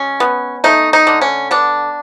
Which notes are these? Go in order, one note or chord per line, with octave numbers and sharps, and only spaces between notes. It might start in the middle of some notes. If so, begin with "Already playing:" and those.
Already playing: G#3 C#4
B3
A3 D#4
D#4
D3
C#4
B3 D4